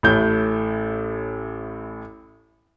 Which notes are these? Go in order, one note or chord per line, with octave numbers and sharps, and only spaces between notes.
A1 A2 G6